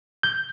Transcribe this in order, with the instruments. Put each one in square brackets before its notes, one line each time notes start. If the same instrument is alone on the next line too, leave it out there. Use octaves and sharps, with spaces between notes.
[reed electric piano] G6